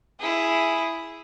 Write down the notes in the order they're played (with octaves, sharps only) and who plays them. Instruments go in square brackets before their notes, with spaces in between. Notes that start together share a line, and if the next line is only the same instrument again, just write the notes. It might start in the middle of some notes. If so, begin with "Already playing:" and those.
[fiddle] E4 G#4